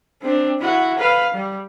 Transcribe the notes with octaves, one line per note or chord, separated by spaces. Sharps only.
C4 D4
E4 F#4
B4 F5
G3